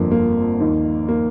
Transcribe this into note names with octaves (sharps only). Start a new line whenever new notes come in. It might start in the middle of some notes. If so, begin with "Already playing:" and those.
Already playing: G1 F2 D3 F3 A#3
A#3
D#2 D#3
A#3